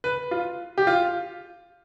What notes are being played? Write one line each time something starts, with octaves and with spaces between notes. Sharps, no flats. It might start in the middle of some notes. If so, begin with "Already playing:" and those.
B4
F4
G4
F4